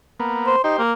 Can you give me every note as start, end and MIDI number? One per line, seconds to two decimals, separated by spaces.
0.20 0.56 58
0.20 0.56 59
0.47 0.60 72
0.64 0.74 63
0.64 0.82 67
0.64 0.82 72
0.79 0.93 58